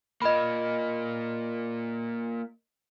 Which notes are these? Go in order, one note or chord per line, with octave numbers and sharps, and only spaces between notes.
A#3 F4 D#5 B5